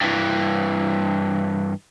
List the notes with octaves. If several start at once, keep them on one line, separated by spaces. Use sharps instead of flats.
G2 E3